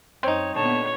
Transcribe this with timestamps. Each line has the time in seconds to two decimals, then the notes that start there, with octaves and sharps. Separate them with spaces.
0.23 F#2 C4 D#4 C#5
0.55 A#2 D3 B3 C#5 A5